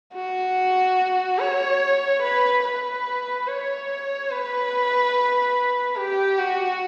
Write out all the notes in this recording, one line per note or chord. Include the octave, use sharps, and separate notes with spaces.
F#4
C#5
B4
B4
C#5
B4
G4
F#4